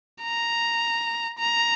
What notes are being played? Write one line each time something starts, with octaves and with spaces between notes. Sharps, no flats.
A#5
A#5